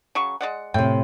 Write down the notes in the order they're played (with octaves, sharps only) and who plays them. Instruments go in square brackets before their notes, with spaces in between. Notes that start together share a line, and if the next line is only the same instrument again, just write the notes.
[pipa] C#3 F#3 C#6
G#3 D5 F#5
[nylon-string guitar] A2 C3 [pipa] G5